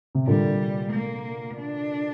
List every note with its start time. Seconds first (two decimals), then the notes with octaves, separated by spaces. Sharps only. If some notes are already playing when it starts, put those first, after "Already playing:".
0.15 C3
0.27 A#2 D3 G3
0.92 A#3
1.57 D4